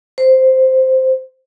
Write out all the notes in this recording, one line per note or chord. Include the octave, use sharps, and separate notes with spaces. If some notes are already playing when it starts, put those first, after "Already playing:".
C5